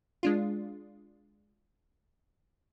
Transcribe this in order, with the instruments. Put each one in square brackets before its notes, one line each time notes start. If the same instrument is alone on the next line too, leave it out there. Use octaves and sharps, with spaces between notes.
[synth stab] G#3 D4 F4